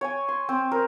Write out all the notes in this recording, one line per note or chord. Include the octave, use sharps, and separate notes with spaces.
C#5 G5 G#5
C6
C4
A#4 C5